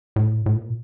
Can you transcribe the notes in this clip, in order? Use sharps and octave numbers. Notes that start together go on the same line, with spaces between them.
A2
A2
A#2